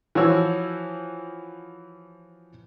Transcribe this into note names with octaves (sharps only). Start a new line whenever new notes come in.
E3 F3 F#4 C#5 E6